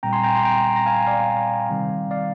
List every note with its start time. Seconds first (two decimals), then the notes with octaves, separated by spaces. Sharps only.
0.03 A#2 G3 C4 G5 A#5
0.13 G#5 C6
0.23 G5 A#5
0.35 C6
0.45 G5 A#5
0.76 A#5
0.86 F5 G#5
1.07 D5 F5
1.69 C3 D#3 G3 C4
2.11 D5 F5